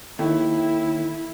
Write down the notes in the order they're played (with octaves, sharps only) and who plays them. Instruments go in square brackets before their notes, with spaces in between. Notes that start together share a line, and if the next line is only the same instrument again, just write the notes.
[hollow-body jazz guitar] D#2 [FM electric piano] D#3 A4 [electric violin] E4